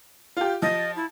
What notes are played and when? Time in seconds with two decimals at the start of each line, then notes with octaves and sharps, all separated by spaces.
0.37 F4 G4
0.62 F3 D#5
0.96 E4